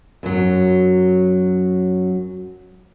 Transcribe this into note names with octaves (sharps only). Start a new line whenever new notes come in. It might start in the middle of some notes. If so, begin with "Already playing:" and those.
F#2 F#3